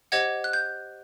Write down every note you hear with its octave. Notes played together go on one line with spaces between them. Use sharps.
G4 C5 D#5 F#5 G#6
F#6
G6